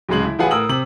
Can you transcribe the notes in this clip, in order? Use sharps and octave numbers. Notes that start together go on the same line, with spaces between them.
D1 C#3 G#3 F#7
E4
A1 F4 G#4 B4 F#5 G#5
A2 A#4 D#6 E6 F#7
C3 F#7